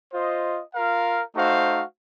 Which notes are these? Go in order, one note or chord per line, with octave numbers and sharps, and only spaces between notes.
F4 C5 D#5
F4 A#4 F5
A3 D#4 F#4 C5 F5